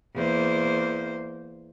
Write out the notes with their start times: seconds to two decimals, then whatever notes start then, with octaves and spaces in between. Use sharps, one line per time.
0.14 E2 A#3 C5